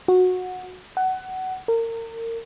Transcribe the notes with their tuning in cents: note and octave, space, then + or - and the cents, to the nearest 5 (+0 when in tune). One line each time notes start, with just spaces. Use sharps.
F#4 -15
F#5 +20
A#4 -30